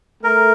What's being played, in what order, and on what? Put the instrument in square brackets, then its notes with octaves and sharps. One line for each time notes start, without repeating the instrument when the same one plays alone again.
[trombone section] A3 [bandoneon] A#4